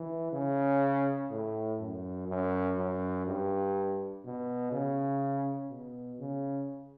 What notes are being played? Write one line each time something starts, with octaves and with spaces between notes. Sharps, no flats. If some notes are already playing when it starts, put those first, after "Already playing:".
Already playing: E3
C#3
A2
F#2
F#2
F#2
G2
B2
C#3
B2
C#3